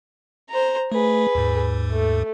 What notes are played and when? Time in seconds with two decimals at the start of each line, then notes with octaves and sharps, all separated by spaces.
0.50 C5 A#5
0.92 A3 G#4 B4
1.35 D#2 G#2
1.91 A3